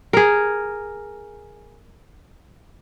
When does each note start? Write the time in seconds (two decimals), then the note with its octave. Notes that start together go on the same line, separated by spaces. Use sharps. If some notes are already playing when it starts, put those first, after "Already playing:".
0.13 G#4 A#4